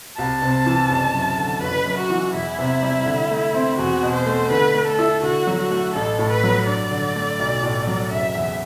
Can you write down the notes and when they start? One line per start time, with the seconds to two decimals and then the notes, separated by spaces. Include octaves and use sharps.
0.17 C2 A5
0.42 C3
0.66 E3
0.89 F#1
1.14 F#2
1.38 D3
1.62 F#1 B4
1.86 F#2
1.98 F#4
2.10 E3
2.34 E2 E4
2.59 C3
2.82 G3
3.06 D3
3.31 A3
3.54 C4
3.78 E2 F#4
4.03 B2
4.14 C5
4.26 A3
4.50 D3 B4
4.74 A3
4.87 A4
4.99 E4
5.23 D3 F#4
5.47 F#3
5.59 F#4
5.71 A3
5.95 A1 A4
6.19 A2
6.31 B4
6.43 F#3
6.67 G2 D5
6.91 D3
7.16 A3
7.40 B1
7.63 A2
7.87 F#3
8.11 F#1 E5
8.35 E2